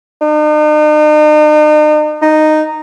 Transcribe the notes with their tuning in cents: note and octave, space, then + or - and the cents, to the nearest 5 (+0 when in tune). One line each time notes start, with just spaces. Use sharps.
D#4 -45
D#4 -10